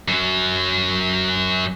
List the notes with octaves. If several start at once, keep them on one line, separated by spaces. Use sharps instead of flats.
F#2 F#3